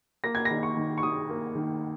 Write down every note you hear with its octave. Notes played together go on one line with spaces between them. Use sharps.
A#3 A#6
G#6
A#6
D#3
C#6
D#3
C#6
D#3 D#6
A#3
D#3